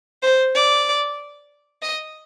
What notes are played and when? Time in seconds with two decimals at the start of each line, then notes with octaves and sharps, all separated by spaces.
0.23 C5
0.55 D5
1.82 D#5